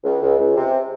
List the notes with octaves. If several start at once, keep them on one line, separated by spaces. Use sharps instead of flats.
C#2
C#2
C#2
C3